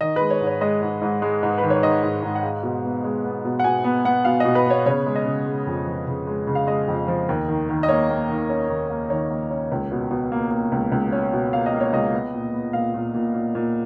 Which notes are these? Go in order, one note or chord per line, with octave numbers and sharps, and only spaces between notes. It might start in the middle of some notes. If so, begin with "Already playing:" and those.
D#3 D#5
G#3 B4
C#5
G#2
C#5
G#3 D#5
G#2
G#2
G#3
G#2
D#3 B4
C#5
D#3 D#5
G#2
G#2
F#5
G#3 F5
B2
B3
G#3
B3
B2
F#5
B2 G#5
B3
B3 F#5
B2 F5
B2 D#5
B4
B3 C#5
C#3 C#5
G#3
D#5
C#3
G#3
F2
F3
C#3
G#3
C#3
F5
G#3 D#5
F2
F3
D#2
D#3
D#3
D#5
A#3 C#5
A#3
D#3
C#4
D#2
A#3
D#3 C#5
A#3
C#4
C#2
B2
B2
A#3
A#3
C#2
C#2
C#4
B2
A#3 F5
D#5
A#3
C#5
C#2 D#5
B3
A#2
B3
A#2 F5
A#2
A#2
A#2
A#2